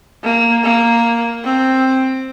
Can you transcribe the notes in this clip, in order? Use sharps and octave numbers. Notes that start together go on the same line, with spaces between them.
A#3
A#3
C4